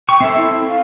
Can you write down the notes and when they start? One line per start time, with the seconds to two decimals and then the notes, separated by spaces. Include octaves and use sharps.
0.09 G5 C#6
0.21 C4 A4 E5
0.37 E4
0.53 E4
0.68 F5